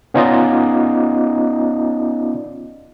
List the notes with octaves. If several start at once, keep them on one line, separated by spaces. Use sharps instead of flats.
B3 C#4 D#4 F4 D5 D#5